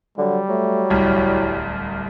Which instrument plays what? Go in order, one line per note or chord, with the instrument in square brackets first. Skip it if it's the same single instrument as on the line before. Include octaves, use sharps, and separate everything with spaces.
[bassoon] D3 [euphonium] F#3 [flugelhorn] G3
[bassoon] F#3 [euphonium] A3
[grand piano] D1 C2 [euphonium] E4